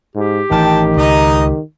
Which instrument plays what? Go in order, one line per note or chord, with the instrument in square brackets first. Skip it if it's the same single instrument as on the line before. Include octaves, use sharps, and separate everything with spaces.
[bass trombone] G#2 [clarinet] G4
[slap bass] A1 E3 [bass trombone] D#3 [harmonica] G5 A5
[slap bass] C#2 [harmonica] D#4 D#5 A#5